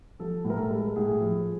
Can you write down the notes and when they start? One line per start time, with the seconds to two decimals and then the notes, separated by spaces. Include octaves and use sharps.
0.20 F3 A4
0.45 A2
0.50 A#4
0.57 A4
0.70 G#3
0.96 A2 G#4
1.21 F3